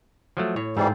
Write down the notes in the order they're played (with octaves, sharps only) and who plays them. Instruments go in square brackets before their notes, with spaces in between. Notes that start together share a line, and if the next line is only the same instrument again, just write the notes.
[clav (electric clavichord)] F3 F#3 A3
[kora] A2 [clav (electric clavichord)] C#5
[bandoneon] F2 E3 G3 [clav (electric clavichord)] G#2 [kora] C4 F4 C5